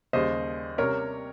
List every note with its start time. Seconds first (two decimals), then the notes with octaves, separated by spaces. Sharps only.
0.13 D#2 C#3 G3 C5 D#5
0.78 C3 G3 C#4 A#4 C#5